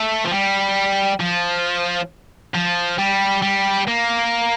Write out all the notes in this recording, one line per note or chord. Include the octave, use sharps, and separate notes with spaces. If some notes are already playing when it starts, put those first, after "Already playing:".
Already playing: A3
F3
G3
F3
F3
G3
G3
A#3